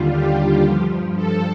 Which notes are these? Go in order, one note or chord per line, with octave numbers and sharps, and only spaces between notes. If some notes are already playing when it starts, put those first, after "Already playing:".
Already playing: D#2 D3 G3 F4
G4
G2 F3
A4